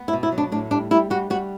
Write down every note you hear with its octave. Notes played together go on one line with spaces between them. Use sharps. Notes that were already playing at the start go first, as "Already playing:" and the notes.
Already playing: B3
E4
B2
E4
F#3
D4
A2 D4
G3 D4
G3 E4
G3 F#4
G3 F#4